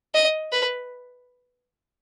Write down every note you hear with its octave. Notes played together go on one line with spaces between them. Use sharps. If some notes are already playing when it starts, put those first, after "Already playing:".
D#5
B4